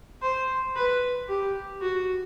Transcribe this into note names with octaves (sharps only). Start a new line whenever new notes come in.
C5
B4
G4
F#4